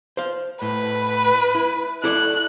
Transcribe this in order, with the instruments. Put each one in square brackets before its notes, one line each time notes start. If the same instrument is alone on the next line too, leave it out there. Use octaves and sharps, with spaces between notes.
[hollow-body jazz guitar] C5 F5
[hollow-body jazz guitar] A2 [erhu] B4
[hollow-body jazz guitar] E4
[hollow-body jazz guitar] E4 A4 D5 [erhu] F#6